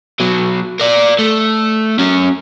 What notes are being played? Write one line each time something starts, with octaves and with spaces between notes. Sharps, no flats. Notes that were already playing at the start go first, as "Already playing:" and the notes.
B2 F#3
A#4 D5
A3
F#3 C#4